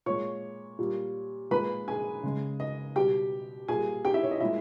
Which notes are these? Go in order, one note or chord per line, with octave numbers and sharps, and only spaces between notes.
A#2 G#3 C#5 C#6
A#2 G3
A#2 G#3 B4 B5
G#4 G#5
C#3 G#3
D#5
B2 G3 G4 G5
A#2 G3 G#4 G#5
G4 G5
E4 E5
C#5
D#5
A#2 G#3 E4 E5